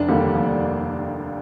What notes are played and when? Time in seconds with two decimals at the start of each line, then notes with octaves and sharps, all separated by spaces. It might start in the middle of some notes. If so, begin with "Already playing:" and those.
Already playing: F1 D4
0.08 D#2 D3 G3 A#3
0.34 F1